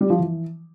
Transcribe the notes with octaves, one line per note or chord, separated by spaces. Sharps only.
G3
F3
E3